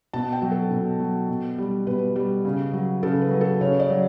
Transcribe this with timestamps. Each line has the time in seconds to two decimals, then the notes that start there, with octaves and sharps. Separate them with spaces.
0.13 B2 A5
0.33 G5
0.42 F#3
0.51 A4
0.71 B2
0.99 F#3
1.29 B2
1.58 G3
1.87 B2 B4
2.16 G3
2.45 C#3
2.73 F#3
3.03 C#3 A4
3.21 B4
3.31 F#3
3.41 A4
3.61 C#3 C#5
3.79 D5
3.90 F#3